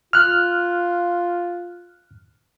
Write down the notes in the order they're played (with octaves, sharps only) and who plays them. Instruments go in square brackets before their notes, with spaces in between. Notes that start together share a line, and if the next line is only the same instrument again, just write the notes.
[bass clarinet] F4 [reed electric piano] F6 F#6